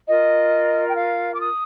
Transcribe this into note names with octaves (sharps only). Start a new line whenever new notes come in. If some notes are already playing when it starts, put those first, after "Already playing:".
F4 A#4 D#5
G5
F5
D6
D#6